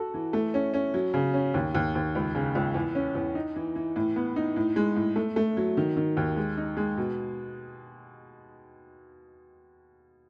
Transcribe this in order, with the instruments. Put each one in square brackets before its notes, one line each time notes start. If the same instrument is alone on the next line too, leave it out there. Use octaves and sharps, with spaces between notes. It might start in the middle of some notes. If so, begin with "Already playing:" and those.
Already playing: [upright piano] F#4 A4
E3
A3
C#4
C#4
F#3
C#3
C#4
D#2
D#2
D#2
C#2
C#3
C#2
E2
C#4
E2
D#4
E3
E3
A2
B3
D#4
A2
G#3
A2
A3
A3
F#3
D#3
D#3
D#2
G#3
D#4
G#3
B2